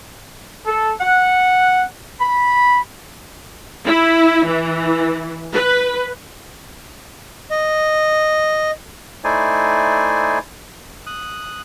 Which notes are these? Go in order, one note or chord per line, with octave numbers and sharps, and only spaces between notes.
A4
F#5
B5
E4
E3
B4
D#5
A3 D#4 E4 C5 D5 G#5
D#6 F#6